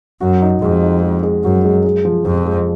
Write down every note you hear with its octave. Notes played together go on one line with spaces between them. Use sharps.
F#2 F#4
D#4
F2 G#3
D#4
G#3
G#3
F#2 F#4
G#3
G#3
F3
F2 F3
G#3